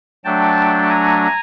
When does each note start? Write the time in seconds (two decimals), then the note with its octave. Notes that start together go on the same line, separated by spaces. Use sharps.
0.25 F#3 A3 D4 G5 A5
0.89 G#5 A#5